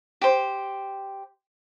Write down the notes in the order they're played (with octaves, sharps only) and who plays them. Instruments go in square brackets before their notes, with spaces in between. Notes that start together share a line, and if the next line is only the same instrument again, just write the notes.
[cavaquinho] G4 C5